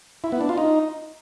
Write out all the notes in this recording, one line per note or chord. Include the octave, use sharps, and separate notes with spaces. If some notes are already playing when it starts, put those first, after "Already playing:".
E4
B3
D4
F4
D#4